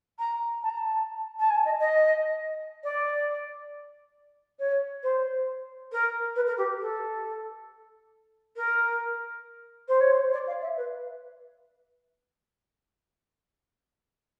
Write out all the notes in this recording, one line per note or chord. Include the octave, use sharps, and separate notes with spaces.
A#5
A5
A#5
A5
A5
G#5
D#5
D#5
D5
C#5
C5
A#4
B4
A#4
G4
A4
A#4
C5
C#5
C5
D5
F5
E5
B4